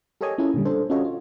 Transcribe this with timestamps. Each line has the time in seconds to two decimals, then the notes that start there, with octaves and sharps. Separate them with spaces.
0.21 G4 A4 A#4 C#5 D#5 G#5
0.38 C#4 E4 F4 G#4 A4
0.54 A#2 D3 G3
0.65 D4 A4 C5
0.90 C#4 F4 F#4 A4 C#5 D#5
1.05 F4